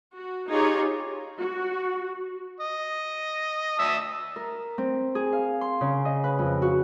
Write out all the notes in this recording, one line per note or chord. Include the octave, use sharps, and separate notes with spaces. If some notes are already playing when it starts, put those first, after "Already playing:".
F#4
D#4 F4 G4 G#4 C#5 A#5
F#4
D#5
E5 A5 D#6
A#4
C4
G#4
F5
C6
C#3
D#5
B4
F2
F#4